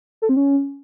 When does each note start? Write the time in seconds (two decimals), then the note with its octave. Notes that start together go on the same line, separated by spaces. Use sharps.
0.22 A4
0.29 C4
0.37 C#4